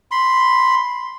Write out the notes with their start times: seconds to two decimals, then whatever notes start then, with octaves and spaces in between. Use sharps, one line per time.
0.11 B5 C6